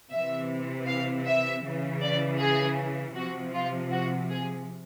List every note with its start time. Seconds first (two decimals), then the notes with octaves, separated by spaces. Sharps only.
0.11 C3 E3 E5
0.87 F5
1.26 E5
1.63 C#3 E3
2.01 D5
2.39 G#4
3.15 C3 F3 F#4
3.53 F4
3.91 F#4
4.29 G#4